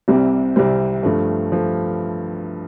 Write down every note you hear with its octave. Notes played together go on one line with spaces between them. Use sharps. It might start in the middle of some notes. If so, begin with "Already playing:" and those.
C2 C3 G3 C4
C2 C3 G3 C4
G2 F3 A3
F3 A3